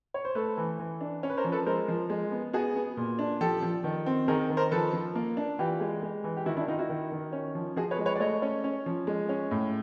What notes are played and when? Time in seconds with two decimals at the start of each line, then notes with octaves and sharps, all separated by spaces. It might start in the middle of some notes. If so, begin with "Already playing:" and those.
0.14 C#5
0.25 C5
0.35 A3 A4 B4
0.58 E3
0.79 E3
1.01 D4
1.23 C#4
1.30 B4
1.37 A#4 C5
1.45 F3
1.52 A4 B4
1.66 G#3 A#4 C5
1.88 F3
2.10 G#3
2.32 B3
2.53 B3 F#4 G#4
2.76 B3
2.97 A#2
3.19 D4
3.41 F3 G4 A4
3.62 F3
3.84 D#3
4.06 C4
4.28 D#3 G#4 A#4
4.50 D#3
4.57 A#4 C5
4.71 F3 A4 B4
4.93 F3
5.15 A#3
5.37 D4
5.59 E3 F4 G4
5.81 G#3
6.02 G#3
6.24 E3
6.37 G4
6.46 D#3 E4 F#4
6.57 D4 E4
6.68 D#3 D#4 F4
6.79 E4 F#4
6.90 D#3
7.12 D#3
7.33 C#4
7.55 F3
7.76 F3 F#4 G#4
7.91 B4 C#5
7.98 G#3
8.06 B4 C#5
8.16 D5
8.20 A3 C#5 D#5
8.42 C#4
8.64 C#4
8.86 F3
9.07 G#3
9.29 C#4
9.51 A2